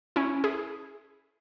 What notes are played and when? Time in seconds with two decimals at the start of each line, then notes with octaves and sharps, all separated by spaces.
0.16 C#4 E4
0.44 E4 G#4